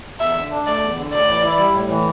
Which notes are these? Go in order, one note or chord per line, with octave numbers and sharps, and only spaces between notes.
E2 E5
D3
D4
A3 D5
E2
D3
A2 D5
E3
E4
G3
A2
E3